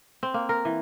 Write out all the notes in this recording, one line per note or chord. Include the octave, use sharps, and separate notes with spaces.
C4
A#3
A#4
E3